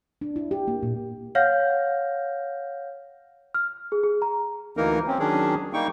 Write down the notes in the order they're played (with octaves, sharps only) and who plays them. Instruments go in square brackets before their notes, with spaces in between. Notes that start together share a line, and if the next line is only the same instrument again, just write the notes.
[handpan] D4
E4
G4
A#3
A#2
[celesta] C#5 F5 F#5 F6 G6 A#6
F6
G#4
G#4
A#5
[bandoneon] D2 E3 A#3 D#4 A#4
C4 C#4
D#3 F#3 C#4 D4 G#4
G3 A#3 D#4 G5 C#6